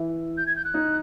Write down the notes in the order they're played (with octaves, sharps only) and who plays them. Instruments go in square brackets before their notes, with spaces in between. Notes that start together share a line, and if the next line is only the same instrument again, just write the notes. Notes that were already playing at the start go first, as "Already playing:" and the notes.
Already playing: [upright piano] E3 E4
[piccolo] G6
G#6
G6
F#6
[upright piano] D#4